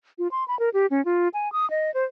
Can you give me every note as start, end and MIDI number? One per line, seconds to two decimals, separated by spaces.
0.18 0.28 65
0.31 0.46 84
0.48 0.58 83
0.59 0.69 70
0.74 0.86 67
0.90 1.04 61
1.05 1.28 65
1.34 1.51 80
1.52 1.68 87
1.70 1.93 75
1.94 2.04 72